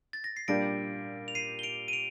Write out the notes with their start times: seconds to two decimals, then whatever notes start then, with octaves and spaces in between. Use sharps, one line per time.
0.13 A6
0.24 A#6
0.37 C7
0.48 A#2 G3 D4 G4 A#6 D7
1.28 F7
1.35 C7 D#7
1.59 G7
1.63 D7 F7
1.88 D#7
1.93 D7 F7